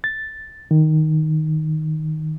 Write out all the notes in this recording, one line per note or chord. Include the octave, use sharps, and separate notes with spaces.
A6
D#3